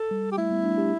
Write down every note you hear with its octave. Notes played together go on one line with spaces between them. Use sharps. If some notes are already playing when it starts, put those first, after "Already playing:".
Already playing: A4
G3
G4
A3 E4
G3 B3
A3 D4
D4 G4